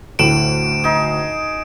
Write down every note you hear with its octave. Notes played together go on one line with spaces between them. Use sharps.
D2 A2 D7 E7 F#7
D#4 G#4